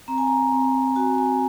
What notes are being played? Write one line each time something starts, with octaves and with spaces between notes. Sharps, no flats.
C4 A#5
G#5
A#5
C4
F#4 G#5
G#5